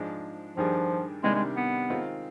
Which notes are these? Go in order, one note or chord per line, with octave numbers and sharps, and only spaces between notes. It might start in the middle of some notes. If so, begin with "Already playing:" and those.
Already playing: G#2 F3 G#3 D4
G2 D#3 F3 G3 D4 G#4
C3 D#3 G3 G#3 D4
G#3
B3
D#3 G#3 C4 F4